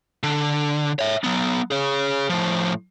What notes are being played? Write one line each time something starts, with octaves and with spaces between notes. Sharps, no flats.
D3
C#5 E5
F#3 B3
G#4 C#5
A2 F3